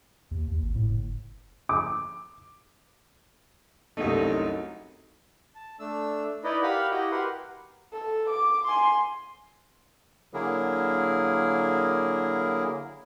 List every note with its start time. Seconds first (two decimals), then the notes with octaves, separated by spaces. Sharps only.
0.31 D#2
0.48 D#2
0.62 G#1
0.75 A2
0.90 F#1
1.69 D6
3.97 C2 F#2 C3 A3 D#4
5.55 A5
5.80 A3 D4 E6
6.44 D#4 E4 B4 D5 D#5
6.63 G4 A#4 F5 F#5 B5
6.91 E4 F#4 G4 D#5 G5
7.11 G4 A#4 B4 F#5 C6
7.93 A4
8.30 D6
8.65 G#5 C6
10.34 D3 F#3 A#3 E4 G#4 A#4